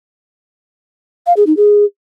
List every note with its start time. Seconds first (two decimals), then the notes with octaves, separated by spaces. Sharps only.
1.27 F5
1.37 G#4
1.47 D#4
1.57 G#4